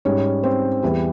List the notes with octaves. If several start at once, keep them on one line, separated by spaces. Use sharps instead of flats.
G#2 G3 C#4 C#5
C4 C5
E2 E3 G3